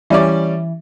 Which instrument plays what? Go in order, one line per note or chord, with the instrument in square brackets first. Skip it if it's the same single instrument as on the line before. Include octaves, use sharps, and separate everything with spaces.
[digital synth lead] E3 [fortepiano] G3 C#4 D5